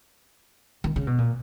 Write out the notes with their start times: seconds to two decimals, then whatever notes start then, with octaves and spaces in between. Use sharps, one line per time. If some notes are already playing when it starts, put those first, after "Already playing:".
0.84 D#3
0.96 C#3
1.07 B2
1.18 A#2